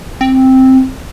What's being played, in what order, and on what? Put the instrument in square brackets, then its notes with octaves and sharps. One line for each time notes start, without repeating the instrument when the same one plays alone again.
[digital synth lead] C4